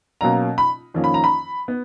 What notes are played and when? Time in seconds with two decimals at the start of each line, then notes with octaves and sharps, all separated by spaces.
0.21 B2 F#3 A#3 C#4 A#5
0.58 B5
0.94 F2 D#3 A#3 C#4
1.04 B5
1.14 A#5
1.24 B5
1.68 B3